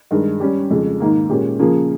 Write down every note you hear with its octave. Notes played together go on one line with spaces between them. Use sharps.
G2 D#3 G#3
G3 C#4 G4
F2 C#3 G#3
G#2 D#3 A#3
A#2 G#3 C#4 G4
C#3 F3 A#3 F4 G#4